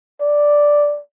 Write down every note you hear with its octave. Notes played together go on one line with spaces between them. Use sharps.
D5